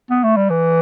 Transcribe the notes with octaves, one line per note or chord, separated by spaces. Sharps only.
B3
A3
G3
E3